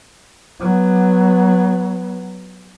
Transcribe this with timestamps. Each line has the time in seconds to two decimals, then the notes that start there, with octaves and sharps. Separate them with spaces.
0.60 F#3 B3